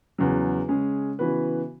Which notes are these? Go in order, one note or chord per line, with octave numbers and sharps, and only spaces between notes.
E2 C#3 F#3
C#3 G#3 C#4 G#4
C#3 E3 B3 F#4 B4